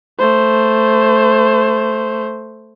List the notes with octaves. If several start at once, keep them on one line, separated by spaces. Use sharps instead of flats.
A3 C5